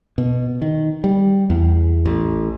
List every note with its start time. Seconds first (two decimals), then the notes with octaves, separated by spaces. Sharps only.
0.18 B2
0.62 D#3
1.04 G3
1.50 E2
2.05 A1